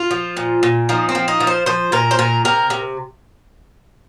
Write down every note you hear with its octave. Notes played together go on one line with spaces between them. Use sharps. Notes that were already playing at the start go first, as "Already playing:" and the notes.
Already playing: F4
F3
A#2
A#2
F3 D#4
C4
F3
D#4
F3
C5
F3 C5
A#2 A#4
C5
A#2 A#4
C3 A#4
C3